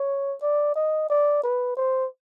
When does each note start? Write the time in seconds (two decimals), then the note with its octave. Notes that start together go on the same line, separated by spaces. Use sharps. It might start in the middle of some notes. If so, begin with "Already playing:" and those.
Already playing: C#5
0.42 D5
0.75 D#5
1.09 D5
1.43 B4
1.77 C5